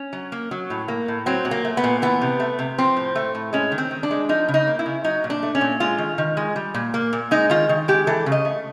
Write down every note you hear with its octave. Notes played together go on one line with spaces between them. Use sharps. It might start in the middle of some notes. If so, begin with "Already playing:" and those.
Already playing: C#4
F#3
A#3
F#3
A2
A#3
A2
F#3 C4
A#2
A#3
A3
B3
A#2
E3 B3
C3
A3
C3
F3 C4
A2
A3
A2
G#3 C#4
D#3
C4
D#3
D4
G#3
F3 D#4
C#3
D#4
A#3
E4
C#3
F#3 D#4
A#2
D4
A3
C#4
A#2
G#3 F4
D#3
D#3
G#3
G3
A#2
A#3
A#2
G#3 D#4
D#3 F4
D#3
G#3 G4
E3 A4
C#3
D#5
A3